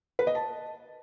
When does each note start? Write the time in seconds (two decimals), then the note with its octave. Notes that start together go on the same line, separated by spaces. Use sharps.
0.19 B4
0.27 D#5
0.35 A5